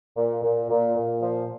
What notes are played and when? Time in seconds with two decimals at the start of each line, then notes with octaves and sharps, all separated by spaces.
0.16 A#2
0.43 A#2
0.70 A#2
0.97 A#2
1.22 F3